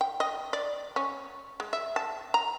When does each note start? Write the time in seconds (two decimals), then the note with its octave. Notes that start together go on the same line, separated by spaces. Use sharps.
0.01 G5
0.20 D#5
0.53 D5
0.96 C#4
1.60 G#3
1.73 E5
1.96 A5
2.34 A#5